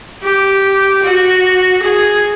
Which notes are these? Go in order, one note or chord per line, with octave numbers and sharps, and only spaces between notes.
G4
F#4
G#4